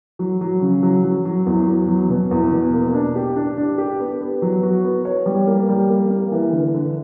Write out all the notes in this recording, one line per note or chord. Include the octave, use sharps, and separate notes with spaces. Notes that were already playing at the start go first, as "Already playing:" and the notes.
F#3
F#3
C#3
F#3
F#3
F#3
E2
F#3
F#3
B2
E2
B2
A#3
D4
G4
D4
D4
G4
B3
B3
F#3
F#4
B3
C#5
G3
A#3
G3
A#3
A#3
E3
D3
D3